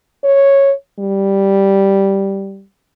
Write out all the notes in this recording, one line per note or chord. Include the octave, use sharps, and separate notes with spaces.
C#5
G3